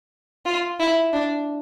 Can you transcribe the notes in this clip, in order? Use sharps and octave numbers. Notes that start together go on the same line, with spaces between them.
F4
E4
D4